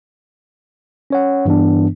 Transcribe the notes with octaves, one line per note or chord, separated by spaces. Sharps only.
C#4 C#5 F#5
G2 E3 B3 D4